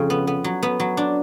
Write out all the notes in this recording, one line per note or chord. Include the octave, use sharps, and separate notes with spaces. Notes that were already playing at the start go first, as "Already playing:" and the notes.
Already playing: F2 C#3
B3
B3
F#3
B3
F#3
D4